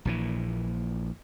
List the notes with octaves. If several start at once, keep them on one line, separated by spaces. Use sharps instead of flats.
A#1 A#2 E3